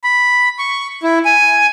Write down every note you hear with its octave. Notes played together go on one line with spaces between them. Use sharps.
B5
C#6
E4
G#5